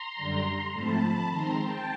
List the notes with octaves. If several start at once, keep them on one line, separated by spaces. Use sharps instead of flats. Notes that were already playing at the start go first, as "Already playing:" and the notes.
Already playing: A#5 C6
F#2 D3 G3
G#2 F3 A3 C4 A5 B5
A5 B5
D#3 G#3 C4 A#5 C6
G5 A5